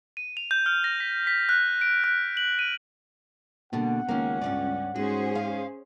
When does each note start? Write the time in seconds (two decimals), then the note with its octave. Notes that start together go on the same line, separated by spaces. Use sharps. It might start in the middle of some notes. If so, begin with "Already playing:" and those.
0.17 D#7
0.37 F7
0.51 G6
0.66 F6
0.84 A#6
1.00 B6
1.27 B6
1.49 F#6
1.81 D7
2.04 F#6
2.37 F#7
2.59 D#7
3.73 B2 D3 G3 A#3 F#5
4.09 C#2 D#3 A#3 C#4
4.41 G2 B2 D5
4.96 G#2 C#4 F#4 G#4 C5
5.35 F5